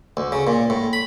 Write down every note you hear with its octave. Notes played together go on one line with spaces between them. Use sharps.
D2
C#3
A#2
A2
B5